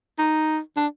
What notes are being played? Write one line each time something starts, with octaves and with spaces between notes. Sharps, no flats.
D#4
D4